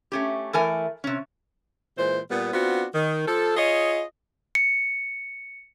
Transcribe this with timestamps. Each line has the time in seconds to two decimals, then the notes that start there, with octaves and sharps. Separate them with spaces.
0.12 A3 C#4 G4
0.53 E3 A3 A#4 G#5
1.04 C3 C#4
1.98 A#2 E3 G#3 C5
2.30 A#2 G3 B3
2.53 B3 C4 D4 F4 F#4
2.94 D#3
3.27 F3 A4
3.57 F4 G#4 C#5 D#5
4.55 C#7